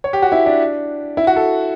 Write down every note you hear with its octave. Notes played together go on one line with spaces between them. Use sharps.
C#5
G4
F#4
E4
D4
E4
F#4
A4